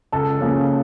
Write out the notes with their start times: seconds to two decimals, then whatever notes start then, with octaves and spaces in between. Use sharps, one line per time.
0.12 C#2 A4 A5
0.40 C#3 F3 A#3 C#4